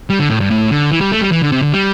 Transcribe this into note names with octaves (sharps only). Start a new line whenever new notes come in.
G3
D3
A2
G2
A2
D3
E3
G3
A3
G3
E3
D3
C3
D3
G3